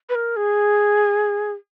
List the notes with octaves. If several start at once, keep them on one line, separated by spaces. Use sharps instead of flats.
B4
A#4
G#4